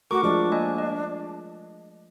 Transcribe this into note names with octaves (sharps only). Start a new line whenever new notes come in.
A3 F#4 A#4 C#6 D6
F3 G#3 D4
A#3 D#5 G#5
D#5